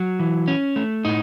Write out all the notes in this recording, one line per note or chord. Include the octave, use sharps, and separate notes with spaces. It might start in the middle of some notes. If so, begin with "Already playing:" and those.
Already playing: F#3
E3
C#4
A3
A2 D#4